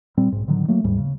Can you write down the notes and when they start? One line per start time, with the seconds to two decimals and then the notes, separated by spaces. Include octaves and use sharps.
0.17 A#2 G3 C4
0.32 B1 G#2
0.47 A2 D3 D#3 F#3
0.68 F#3 A3 A#3
0.84 D#2 G#2 G3
0.98 C#3